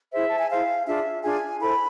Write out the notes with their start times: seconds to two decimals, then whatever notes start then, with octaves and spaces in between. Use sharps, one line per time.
0.11 E4 G#4 C5 E5
0.27 A5
0.38 G#5
0.49 E4 G#4 C5 F5
0.86 D4 F4 G#4 E5
1.22 D4 F4 G#4 G#5
1.60 E4 A4 C5 B5